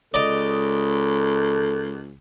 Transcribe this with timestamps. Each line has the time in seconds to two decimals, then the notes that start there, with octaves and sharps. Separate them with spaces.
0.14 C#2 A4 D5 D#5 A#5